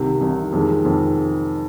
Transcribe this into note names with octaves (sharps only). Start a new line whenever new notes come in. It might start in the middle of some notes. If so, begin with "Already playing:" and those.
Already playing: C2 C3 D#3
C2 C3 D#3
F2 D#3 G#3
F2 D#3 G#3